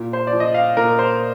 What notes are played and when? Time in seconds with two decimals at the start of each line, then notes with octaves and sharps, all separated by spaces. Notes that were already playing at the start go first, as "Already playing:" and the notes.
Already playing: A#2
0.13 C5
0.27 D5
0.33 F3
0.40 D#5
0.54 F5
0.77 A#2 A#4
0.99 C5